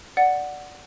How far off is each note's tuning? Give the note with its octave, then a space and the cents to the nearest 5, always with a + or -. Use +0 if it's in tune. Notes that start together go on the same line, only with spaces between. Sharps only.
D5 +0 F#5 +0